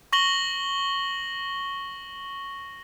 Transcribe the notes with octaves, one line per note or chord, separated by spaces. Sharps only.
C#6 A#6 F#7 G7